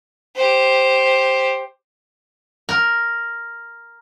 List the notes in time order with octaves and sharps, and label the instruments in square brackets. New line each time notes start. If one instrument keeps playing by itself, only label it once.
[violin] G4 C5
[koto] A#4